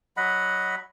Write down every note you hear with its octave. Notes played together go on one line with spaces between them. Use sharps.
F#3 D#5 F#5 B5